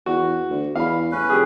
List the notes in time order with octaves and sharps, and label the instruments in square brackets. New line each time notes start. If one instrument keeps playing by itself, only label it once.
[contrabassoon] E2 [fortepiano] F#4
[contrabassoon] D2
[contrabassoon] E2 [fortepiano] F5 B5
[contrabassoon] A1 [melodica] C#4 B4
[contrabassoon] F1 [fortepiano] G4 G#4